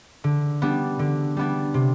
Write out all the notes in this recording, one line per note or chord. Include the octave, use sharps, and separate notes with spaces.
D3
G3 B3 D4
D3
G3 B3 D4
C3